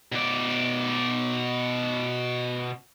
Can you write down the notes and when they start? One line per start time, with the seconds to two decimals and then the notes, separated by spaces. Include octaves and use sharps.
0.12 B2 D5